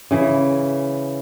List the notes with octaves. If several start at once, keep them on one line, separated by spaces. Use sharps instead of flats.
C#3 E3